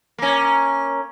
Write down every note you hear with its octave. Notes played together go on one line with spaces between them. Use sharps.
A#3 C#4